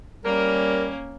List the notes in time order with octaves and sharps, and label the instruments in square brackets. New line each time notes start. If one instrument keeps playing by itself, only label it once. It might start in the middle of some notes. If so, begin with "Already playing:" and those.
[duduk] G3 [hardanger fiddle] A#3 C#4 [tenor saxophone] A#4